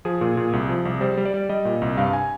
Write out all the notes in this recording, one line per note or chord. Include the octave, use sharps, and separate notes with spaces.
F3 G#4
A#2
A#2
C2
F3
C2
G3 C5
G3
D5
G3
G3 D#5
A#2
C2
G2 F5
G#5